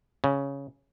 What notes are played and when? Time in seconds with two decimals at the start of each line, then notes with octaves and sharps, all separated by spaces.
0.24 C#3